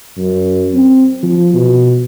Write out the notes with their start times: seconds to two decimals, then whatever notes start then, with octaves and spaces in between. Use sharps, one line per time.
0.18 F#2
0.74 C4
1.23 F3
1.54 B2